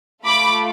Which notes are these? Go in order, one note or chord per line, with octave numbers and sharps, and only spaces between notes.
A3 F4 A4 B5 D6